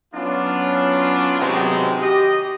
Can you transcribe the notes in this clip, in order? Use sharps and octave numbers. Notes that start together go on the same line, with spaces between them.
F#3 B3 C#4 D4 F4
C3 D#3 F#3 G#3 B3 C4
G4 D#5